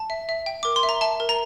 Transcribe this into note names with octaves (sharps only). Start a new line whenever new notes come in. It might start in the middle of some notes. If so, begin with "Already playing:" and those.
Already playing: A5
E5
E5
G5
A#4 D6
C6
E5
A#5
E5 A5
A#4
A#5